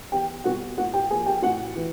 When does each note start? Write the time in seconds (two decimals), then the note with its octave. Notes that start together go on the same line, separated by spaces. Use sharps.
0.12 E2 G4 G5
0.44 B2 G3 F#4 F#5
0.78 A2 F#4 F#5
0.93 G4 G5
1.10 F3 A#3 G#4 G#5
1.26 G4 G5
1.42 A2 F#4 F#5
1.76 E3